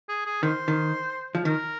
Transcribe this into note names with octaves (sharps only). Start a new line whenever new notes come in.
G#4
G#4
D#3 C5
D#3
F3
D#3 A#4